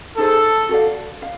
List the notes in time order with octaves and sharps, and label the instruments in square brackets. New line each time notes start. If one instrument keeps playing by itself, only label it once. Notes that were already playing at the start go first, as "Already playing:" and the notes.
[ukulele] D#4 G#4 C5 [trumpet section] A4
[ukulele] F#4 A4 D5 F5
F5